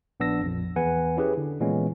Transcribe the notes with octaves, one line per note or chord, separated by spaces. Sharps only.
A#1 B3 D4 E6 A#6
A#1 F2
E2 B4 F#5 G#5
C#4 E4 G4 G#4 B4
D3
A#2 E3 G#3 B3 C#4